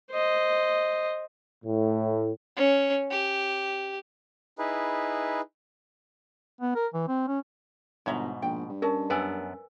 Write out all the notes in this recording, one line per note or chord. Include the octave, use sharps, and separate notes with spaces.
C5 D#5
A2
C#4
G4
D#4 E4 G#4 B4
B3
A#4
E3
C4
C#4
G1 G#2 B2 C#5 E5 A#5
A#1 G5
G2
C#4 A#4 D#5 A5
F#2 B3 B4 D5 G#5 E6